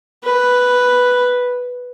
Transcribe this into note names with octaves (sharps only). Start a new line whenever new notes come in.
B4